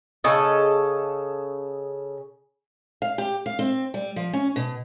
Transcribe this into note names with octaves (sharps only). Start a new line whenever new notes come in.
C#3 A4 D#5
F5
G4
F5
C4
G3
F3
C#4
B2